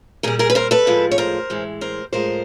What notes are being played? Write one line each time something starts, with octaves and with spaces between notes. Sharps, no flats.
A#2 G3 G#4 A#4
G#4 A#4
B4
A#4 C5
A4 B4
A2 F3 G#3
C#5
A#4 C5
A2 E3 G#3
A#4 C5
A2 F3 G#3 A#4 C5